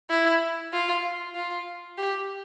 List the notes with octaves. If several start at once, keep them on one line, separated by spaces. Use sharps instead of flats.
E4
F4
F4
G4